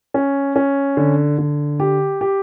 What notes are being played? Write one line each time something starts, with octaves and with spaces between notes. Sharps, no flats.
C#4
C#4
D3
D3
G4
G4